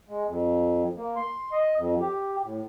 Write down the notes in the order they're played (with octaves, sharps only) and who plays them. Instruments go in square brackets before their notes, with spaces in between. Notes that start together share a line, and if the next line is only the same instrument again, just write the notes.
[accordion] G#3
F2
A#3
C6
D#5
F2
G4
A2